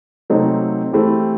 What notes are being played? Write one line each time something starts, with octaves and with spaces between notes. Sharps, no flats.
C3 F#3 A3 C4 D#4
E3 A3 C4 E4 G4